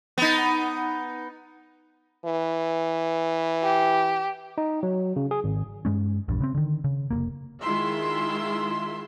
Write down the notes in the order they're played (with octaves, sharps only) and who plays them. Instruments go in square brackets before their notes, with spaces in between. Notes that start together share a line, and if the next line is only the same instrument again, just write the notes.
[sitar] B3 D#4
[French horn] E3
[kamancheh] G4
[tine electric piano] D#4
F#3
C#3
G#4
G#1
[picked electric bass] G2 G#3 C#4
A#1 E2 G2
C#3 B3 C4
D3 D#3
C#3
F1 F#2 A#3
[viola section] D#3 G#3 E4 F4 E5 C6